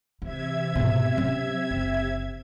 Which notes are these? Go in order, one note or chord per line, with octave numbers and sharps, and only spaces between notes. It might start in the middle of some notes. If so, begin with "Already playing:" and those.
C3 E3 E5 G#6
G#2 B2
F#3 C#4
F#1